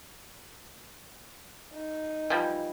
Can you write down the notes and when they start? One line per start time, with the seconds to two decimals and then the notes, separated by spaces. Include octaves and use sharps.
1.74 D#4
2.30 E3 F3 G3